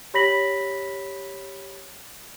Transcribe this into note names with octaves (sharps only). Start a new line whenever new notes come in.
G4 C#5 B5 A#6 B6 F#7